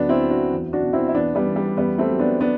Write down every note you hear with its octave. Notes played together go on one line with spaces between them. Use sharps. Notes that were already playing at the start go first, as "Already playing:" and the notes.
Already playing: D2 F#3 B3 D4
C4 E4
F#3
D4 F#4
E2
D4 F#4
B2
C4 E4
E4
E2 B3 D4
G3 B3
E2
G3
E2 G3 B3
A3 C4
F#3
B3 D4
B3 D4